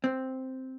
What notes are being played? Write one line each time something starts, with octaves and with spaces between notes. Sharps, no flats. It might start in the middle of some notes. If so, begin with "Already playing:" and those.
C4